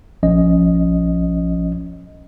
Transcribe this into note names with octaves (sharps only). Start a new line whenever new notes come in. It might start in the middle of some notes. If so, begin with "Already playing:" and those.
A#1 F3 C#4 D#5